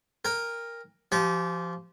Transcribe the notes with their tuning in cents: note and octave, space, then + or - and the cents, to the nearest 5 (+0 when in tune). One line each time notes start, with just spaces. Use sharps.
A#4 +0 G5 +45
F3 -15 G4 -25 G#5 +10